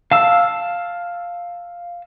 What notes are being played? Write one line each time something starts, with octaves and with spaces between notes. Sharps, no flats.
F5 A5 E6